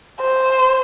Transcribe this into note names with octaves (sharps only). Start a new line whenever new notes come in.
C5